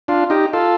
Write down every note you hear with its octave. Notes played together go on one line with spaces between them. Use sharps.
D4 F4
D#4 G4
F4 A4